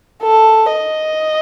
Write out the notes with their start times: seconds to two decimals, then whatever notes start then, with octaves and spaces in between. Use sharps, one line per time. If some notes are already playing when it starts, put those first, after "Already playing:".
0.23 A4
0.72 D#5